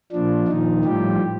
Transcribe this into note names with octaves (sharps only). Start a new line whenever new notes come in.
A#2 F3 D4
A#2 D#3 F3 D#4
A2 F3 G3 G4